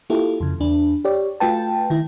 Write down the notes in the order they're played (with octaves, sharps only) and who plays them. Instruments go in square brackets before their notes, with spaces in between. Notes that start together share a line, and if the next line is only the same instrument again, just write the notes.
[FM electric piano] A#3 E4 F4 G4 A4
F2 C#3
E2 D4
G4 C#5 D5
A3 F4 F#4 B4 G5 A5
D#3 E4